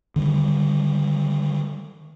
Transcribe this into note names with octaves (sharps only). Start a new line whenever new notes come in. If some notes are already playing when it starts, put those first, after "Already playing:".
D3 D#3 G3